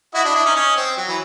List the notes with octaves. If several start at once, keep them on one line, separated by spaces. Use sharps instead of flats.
E4 F#4 D#5
D4 E4
D4 E4
C#4 D#4
C#4
C4
F#3
E3